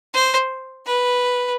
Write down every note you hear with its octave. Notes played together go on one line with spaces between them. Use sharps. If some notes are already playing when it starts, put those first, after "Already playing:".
C5
B4